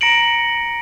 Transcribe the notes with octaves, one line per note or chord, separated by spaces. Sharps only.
A#5 A#6 C#7 D7 F#7